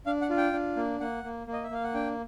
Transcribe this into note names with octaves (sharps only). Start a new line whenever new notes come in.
D4 F5
F#5
F4
G5
D4
A#3
A#3 F#5
A#3
A#3
D#5
E5
A#3 F5
F#5
D4 G5